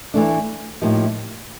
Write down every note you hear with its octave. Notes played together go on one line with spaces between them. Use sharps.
E3 A3 D4
A2 F3 A#3 D#4 G4